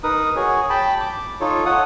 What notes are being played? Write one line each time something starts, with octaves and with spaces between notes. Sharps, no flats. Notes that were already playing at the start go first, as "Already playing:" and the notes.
D#4 A#4 B4 D#6
F#4 G#4 C#5 G#5
G5 A5 B5
D6
D#4 F4 A4 C#5
A4 C#5 F#5 D#6